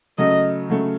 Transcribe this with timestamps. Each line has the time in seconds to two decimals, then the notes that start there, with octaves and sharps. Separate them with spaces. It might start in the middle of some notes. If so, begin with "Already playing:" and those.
0.18 C#3 F#3 A3 D#5
0.70 C#3 F#3 A3